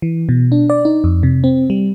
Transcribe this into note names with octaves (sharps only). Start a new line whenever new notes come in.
E3
B2
D4
D5
D#4
F2
C3
C4
G3